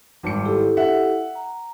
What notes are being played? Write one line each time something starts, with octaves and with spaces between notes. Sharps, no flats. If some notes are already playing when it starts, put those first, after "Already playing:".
G#1 G3 A5 D6 C#7
E4 G4 A4
E5 F#5
A#5